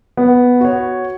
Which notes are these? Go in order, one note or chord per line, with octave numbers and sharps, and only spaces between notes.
B3
F#4 C#5